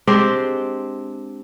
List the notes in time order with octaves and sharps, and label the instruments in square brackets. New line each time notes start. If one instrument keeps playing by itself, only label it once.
[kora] G#3 C4 D4 G4